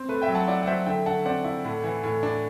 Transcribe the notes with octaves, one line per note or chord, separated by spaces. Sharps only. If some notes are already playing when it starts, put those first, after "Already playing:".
Already playing: C4
A3 B4
E5 G5
F#3
F#5 A5
E4 D5 F#5
F#5
F#3 C5 E5
D3 E5 G5
D3 F#5 A5
C4 D5 F#5
E4
A2
E3
A2
D4